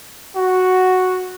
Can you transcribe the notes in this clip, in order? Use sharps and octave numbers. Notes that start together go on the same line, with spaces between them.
F#4